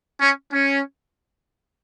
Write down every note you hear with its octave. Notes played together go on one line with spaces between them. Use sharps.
C#4
C#4